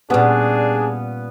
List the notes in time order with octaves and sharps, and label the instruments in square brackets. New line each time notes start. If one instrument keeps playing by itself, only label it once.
[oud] A#2 G3 [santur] B3 C#4 B4 [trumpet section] D4 G#4